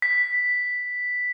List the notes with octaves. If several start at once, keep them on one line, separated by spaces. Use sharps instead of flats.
B6